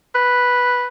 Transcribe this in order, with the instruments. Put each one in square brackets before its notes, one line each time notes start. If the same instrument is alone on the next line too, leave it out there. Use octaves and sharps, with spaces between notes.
[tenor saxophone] B4